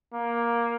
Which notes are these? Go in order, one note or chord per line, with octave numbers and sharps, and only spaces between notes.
A#3